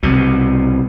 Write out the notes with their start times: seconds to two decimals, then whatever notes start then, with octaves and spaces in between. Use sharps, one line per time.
0.03 C2 B2